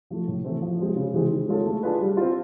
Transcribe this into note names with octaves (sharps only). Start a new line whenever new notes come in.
F3 A3
A2
E3 A3 C4 E4
F3
G#3 C4 F4
C#3
E3 G#3 C4
D#3
G#3 C#4 F4 A4
A3
D4 F4 G#4 B4
G3
C4 F4